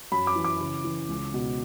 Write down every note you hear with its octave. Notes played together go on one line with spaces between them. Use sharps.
F#2 B5
D6
E3
D6
C#3
E3
C#2
B2